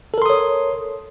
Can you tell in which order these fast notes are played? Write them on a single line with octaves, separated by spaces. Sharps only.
A4 A#4 C6 D#6 C#5